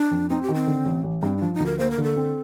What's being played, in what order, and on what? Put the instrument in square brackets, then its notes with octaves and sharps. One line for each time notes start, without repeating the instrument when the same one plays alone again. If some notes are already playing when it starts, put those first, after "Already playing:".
Already playing: [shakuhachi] D4
[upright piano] F2
[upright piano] C4 [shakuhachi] D#4
[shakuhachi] G4
[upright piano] D#3
[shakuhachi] C4
[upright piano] D3
A1
A1
[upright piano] G2 [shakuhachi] C4
[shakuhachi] D#4
[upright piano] F3 [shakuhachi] D4
[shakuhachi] D#4
[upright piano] D2
[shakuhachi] A#4
[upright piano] A#3 [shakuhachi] C5
[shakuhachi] A#4
[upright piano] D3
[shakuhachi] A4
[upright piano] C4